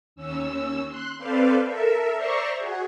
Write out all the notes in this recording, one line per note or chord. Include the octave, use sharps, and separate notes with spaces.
D#2 C#4 E6
C6 F#6
C4 A4 B4 C5 D5 F5
A4 A#4 E5
C5 D5 E5 A#5 C6 C#6
F#4 G#4